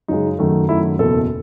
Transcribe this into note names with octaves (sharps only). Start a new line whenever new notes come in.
F#2 C#3 G#3 D#4
F#2 D#3 F#3 A3
F#2 D#3 F#3 A3 E4
F#1 E2 B2 A4